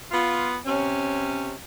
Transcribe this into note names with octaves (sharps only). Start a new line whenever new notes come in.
B3 F4
C3 C#4